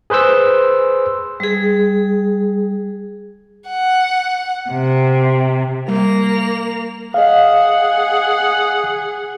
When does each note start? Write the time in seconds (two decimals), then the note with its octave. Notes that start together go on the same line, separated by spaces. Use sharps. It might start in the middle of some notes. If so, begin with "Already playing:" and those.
0.10 G#4 B4 C5 C6 E6
1.40 G3 G#4
3.68 F#5
4.70 C3
5.88 G3 A#3 F7
7.14 G#4 D#5 F5 F#5